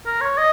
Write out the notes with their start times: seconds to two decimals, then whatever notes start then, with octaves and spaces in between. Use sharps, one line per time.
0.06 A#4
0.21 C#5
0.38 D#5